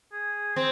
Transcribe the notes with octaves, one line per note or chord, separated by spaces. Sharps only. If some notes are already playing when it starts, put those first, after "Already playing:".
G#4
C4